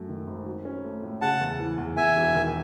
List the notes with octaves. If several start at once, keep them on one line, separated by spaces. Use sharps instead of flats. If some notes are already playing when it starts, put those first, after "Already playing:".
Already playing: F#2 A3
D#3
G#1
F#3
C#4
A3
A2
C#3 F#5 A5
E2
E3
E2
E2 E5 G#5
E1
D#3